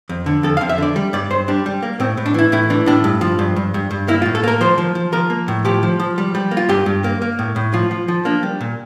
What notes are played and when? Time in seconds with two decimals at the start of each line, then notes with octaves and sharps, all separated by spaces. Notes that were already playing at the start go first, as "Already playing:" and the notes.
0.09 F2
0.26 D3
0.43 F2 A4
0.57 F5
0.61 F2
0.69 E5
0.78 D3 D5
0.96 G3
1.13 G2 D5
1.30 G2 C5
1.48 G3 D4
1.66 G3
1.83 A#3
2.00 A2 C4
2.17 A2
2.26 D4
2.34 E3 E4
2.52 A2 E4
2.70 E3 D4
2.86 A2 D4
3.04 G2
3.21 F3
3.39 G2
3.56 G2
3.74 G2
3.91 G2
4.08 A#3 E4
4.22 F4
4.26 A2
4.35 A4
4.44 A#3 A#4
4.61 F3 C5
4.78 F3
4.95 F3
5.13 F3 A#4
5.30 A#3
5.48 A2
5.65 F3 G4
5.83 F3
6.00 F3
6.18 G3
6.35 G3
6.51 A#3
6.57 F4
6.69 G2 G4
6.86 G2
7.04 A#3
7.22 A#3
7.39 A2
7.56 A2
7.74 F3 F4
7.91 F3
8.08 F3
8.25 A#3 D4
8.43 G3
8.61 A#2